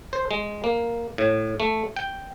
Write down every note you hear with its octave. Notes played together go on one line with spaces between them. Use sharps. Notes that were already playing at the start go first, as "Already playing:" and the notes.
C5
G#3
A#3
A2
A3
G5